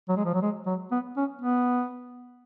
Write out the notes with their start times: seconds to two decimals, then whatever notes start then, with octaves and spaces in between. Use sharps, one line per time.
0.09 F#3
0.16 G#3
0.25 F3
0.34 F#3
0.42 G#3
0.66 F#3
0.91 B3
1.16 C#4
1.41 B3